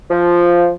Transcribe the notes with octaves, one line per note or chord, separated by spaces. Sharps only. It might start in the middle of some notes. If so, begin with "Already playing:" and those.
F3